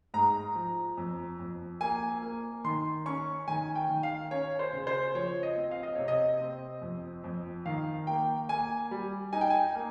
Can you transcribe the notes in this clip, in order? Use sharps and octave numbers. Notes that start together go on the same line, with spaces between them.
G#2 A#5
F3
F2
F2
A#3 G#5
A#3
D#3 C6
C#4 C#6
D#3 G#5
G5
D#3
F5
C#4 C#5
C5
C#3
C5
F3 C#5
D#5
C4
F5
D#5
C3 C#5
D#5
C4
F2
F2
D#3 F5
A#3 G5
A#3 G#5
G3
D#4 G#5
G5
G#5
A#3